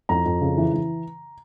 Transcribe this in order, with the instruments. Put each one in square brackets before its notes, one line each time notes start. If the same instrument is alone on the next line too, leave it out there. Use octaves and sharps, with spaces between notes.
[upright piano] F2 A#5
F2
C#3
E3
E3